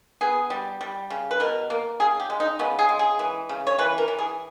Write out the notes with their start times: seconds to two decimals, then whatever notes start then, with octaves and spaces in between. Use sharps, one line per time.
0.21 B3 G#4
0.50 G3
0.81 G3
1.10 C#3
1.31 B4
1.40 B2 A#4
1.70 A#3
2.00 C#3 G#4
2.20 G4
2.30 G#3
2.40 D#4
2.59 C#3 B3
2.79 G#4
2.89 G#3
2.99 G#4
3.19 E3
3.49 C#3
3.67 C#5
3.79 E3 B4
3.98 A#4
4.08 E3
4.19 G#4